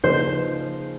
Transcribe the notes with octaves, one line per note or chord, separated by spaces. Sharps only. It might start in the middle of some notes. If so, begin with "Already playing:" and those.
C#3 F3 A#3 D#4 C5